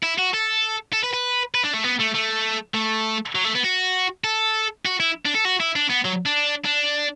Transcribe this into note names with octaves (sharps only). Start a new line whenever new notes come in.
E4
F#4
A4
A4
B4
B4
B4
D4
A3
B3
A3
A3
A3
F#3
A3
B3
F#4
A4
F#4
E4
D4
A4
F#4
E4
D4
B3
F#3
D4
D4